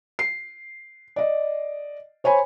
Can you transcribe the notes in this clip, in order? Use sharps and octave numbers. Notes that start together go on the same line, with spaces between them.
C7
D5 D#5
C5 C#5 G#5 B5